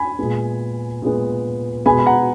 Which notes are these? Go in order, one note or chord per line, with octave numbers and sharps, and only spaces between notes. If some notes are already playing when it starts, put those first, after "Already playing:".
Already playing: G#5 B5
A#2 G#3 B3
A#2 G#3 B3
B2 G#3 B3 G#5 B5
B5
F#5 A#5